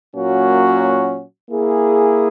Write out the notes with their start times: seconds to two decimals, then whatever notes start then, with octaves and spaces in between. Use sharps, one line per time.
0.15 A#2 F#3 A#3 C#4 F#4
1.49 A#3 E4 G#4